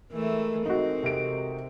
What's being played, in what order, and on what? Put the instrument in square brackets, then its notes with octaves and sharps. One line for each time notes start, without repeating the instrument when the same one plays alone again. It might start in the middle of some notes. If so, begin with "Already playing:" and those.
[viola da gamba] E3 A3 [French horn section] G#3 A4 A#4
[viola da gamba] C4 [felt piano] D#4 F#4
[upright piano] C3 D7